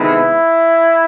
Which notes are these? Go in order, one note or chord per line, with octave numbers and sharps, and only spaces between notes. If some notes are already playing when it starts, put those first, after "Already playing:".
Already playing: C3 D#3 G#3 B3 E4